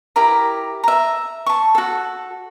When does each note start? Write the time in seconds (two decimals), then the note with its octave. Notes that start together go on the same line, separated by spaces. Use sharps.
0.16 E4 G4 A#4 A#5
0.84 E5 A#5
1.46 A5 C#6
1.75 F#4 A4